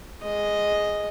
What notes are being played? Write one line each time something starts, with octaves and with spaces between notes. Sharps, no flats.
G#3 D#5